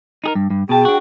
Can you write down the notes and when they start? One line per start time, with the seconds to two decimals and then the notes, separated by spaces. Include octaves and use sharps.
0.24 D#4 G#4 A#4
0.35 G2
0.50 G2
0.69 B2 G#4 G5 A5
0.85 D4 F#4